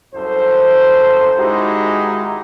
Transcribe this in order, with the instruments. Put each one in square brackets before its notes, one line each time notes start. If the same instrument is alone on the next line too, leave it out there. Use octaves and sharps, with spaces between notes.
[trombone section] C2 F#2 A4 C5
G#1 G#3 D#4 E4 F#4 G4